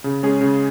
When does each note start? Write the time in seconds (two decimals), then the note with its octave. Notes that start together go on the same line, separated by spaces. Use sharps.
0.04 C#3
0.23 G#3 C#4 G#4
0.41 C#3